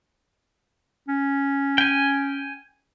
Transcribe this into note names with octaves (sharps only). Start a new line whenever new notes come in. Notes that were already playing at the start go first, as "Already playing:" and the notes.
C#4
G5 G#5